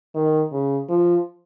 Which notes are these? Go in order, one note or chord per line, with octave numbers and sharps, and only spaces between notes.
D#3
C#3
F3